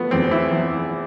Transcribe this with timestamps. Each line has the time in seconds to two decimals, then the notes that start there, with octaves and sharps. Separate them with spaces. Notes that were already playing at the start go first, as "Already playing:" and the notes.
Already playing: F3 A3 B3
0.11 E2 C4
0.31 E4
0.51 E2